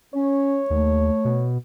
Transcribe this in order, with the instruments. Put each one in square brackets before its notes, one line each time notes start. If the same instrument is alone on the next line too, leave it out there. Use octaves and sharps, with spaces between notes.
[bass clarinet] C#4 [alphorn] C#5
[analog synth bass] D#2 [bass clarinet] A3
[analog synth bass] B2